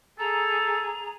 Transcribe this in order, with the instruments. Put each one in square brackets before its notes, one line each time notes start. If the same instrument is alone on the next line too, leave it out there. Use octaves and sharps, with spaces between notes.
[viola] G#4 [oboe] A4 [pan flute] A#5